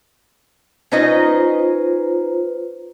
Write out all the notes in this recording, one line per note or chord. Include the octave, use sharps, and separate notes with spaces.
C#4 D#4 F4 B4 C5 D#5